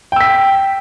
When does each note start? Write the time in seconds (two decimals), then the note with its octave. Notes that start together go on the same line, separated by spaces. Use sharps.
0.12 G5
0.16 E6
0.21 B6